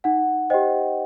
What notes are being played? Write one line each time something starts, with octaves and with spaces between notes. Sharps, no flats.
D#4 F#5
G4 C5 D#5 G5